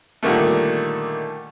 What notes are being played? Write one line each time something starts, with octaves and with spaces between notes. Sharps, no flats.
A#2 D3 D#3 G3 A3